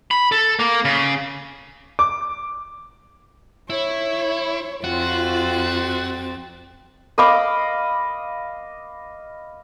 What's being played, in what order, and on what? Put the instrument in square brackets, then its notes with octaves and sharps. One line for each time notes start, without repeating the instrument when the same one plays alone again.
[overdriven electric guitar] B5
A4
A#3
C#3
[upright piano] D6
[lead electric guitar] E4 [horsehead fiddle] C#5
[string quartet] F2 C4 A6 [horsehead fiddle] F4 [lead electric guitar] F#4
[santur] D#5 F5 B5 D6